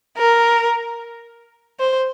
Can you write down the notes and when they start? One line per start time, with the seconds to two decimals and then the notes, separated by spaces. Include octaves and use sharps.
0.18 A#4
1.80 C5